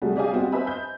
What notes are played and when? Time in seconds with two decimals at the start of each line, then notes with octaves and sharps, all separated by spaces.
0.02 C3 F#3 G3 A3 F#4 G#4
0.16 G4 G#4 D5 D#5 F5 G#5
0.32 G3 B3 C4 F#4 G4
0.52 B4 C5 D#5 E5 G#5 B5
0.67 G6